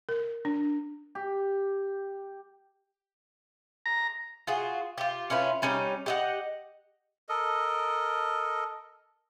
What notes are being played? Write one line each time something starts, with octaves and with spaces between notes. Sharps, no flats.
A#4
D4
G4
A#5
F4 F#4 G#4
F4 G4
C#4 E4 F4 B4
G3 C#4 D#4 G4
G4 D#5 F#5
A4 A#4 D#5